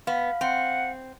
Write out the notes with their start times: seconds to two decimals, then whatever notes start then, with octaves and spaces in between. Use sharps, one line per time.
0.07 B3 F5
0.41 C4 F#5